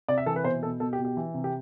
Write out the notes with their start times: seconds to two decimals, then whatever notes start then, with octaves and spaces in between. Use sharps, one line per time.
0.09 C3 D5
0.18 E5
0.26 E3 A4
0.36 B4
0.44 B2 C5
0.63 B2 A4
0.80 B2 A4
0.93 G4
0.99 B2
1.05 G4
1.17 E3
1.34 C3
1.44 G4